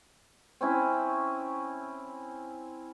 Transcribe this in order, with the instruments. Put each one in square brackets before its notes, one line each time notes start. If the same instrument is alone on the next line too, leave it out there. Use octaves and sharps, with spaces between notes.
[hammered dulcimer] C4 C#4 E4